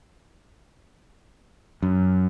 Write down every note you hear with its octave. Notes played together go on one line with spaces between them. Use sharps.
F#2